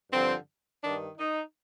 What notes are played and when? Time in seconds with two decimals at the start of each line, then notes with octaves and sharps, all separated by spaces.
0.12 G2 D3 F3 C4
0.83 G2 D#3 D4
1.18 D#4